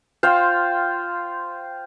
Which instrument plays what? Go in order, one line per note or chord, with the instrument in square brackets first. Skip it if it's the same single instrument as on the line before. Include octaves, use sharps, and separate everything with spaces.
[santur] F4 C5 F5 G5